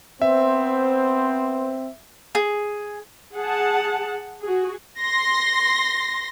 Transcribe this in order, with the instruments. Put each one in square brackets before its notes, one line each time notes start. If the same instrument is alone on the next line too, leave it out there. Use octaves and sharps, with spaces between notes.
[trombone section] B3 C5 [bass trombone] C4 [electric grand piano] E5
[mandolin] G#4
[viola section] G#4 F#5 A5
F#4 G#4
[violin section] C6 A#6